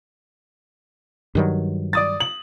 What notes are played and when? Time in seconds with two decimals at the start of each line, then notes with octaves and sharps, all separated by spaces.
1.35 G2 D#3 F#3
1.93 D5 D#6 A6
2.20 F#7